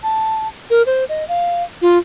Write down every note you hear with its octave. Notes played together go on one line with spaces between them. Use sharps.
A5
A#4
C5
D#5
F5
F4